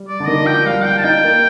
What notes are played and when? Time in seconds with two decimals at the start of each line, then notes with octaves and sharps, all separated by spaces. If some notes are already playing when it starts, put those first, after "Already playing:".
Already playing: G3
0.08 D5
0.20 D3
0.27 D#3 D#5
0.46 F3 G5
0.65 G3 F5
0.84 G5
0.98 A5
1.04 D#4 G5
1.24 A#3